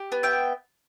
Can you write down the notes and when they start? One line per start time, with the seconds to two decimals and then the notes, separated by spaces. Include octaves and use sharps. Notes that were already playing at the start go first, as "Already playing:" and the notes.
Already playing: G4
0.12 B3
0.23 E5 G5